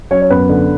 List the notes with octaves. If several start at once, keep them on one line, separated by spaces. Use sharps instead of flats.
F#3 C#4 C#5
C#5
F#2 B3 B4
D3